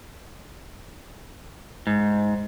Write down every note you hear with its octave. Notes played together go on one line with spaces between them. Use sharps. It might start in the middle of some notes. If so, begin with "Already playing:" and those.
G#2